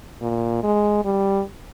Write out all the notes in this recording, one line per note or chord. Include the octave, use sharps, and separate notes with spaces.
A#2
G#3
G3